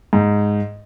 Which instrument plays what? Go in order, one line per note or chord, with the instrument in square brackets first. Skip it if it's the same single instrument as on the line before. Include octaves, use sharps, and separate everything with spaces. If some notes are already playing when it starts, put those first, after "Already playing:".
[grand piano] G#2